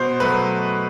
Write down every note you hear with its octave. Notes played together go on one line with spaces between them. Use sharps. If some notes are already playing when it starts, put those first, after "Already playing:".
Already playing: B2 C5
F#3 A3 B4